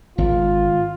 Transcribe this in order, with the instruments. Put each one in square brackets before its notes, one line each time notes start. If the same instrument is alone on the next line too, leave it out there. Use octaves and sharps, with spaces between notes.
[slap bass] G#1 [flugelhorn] F4